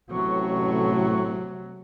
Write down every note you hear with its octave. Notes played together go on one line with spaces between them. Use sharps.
A1 A2 C3 F#3 A3 C#6